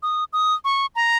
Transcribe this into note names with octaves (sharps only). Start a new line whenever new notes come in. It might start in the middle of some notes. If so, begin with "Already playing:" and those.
D#6
D#6
C#6
A#5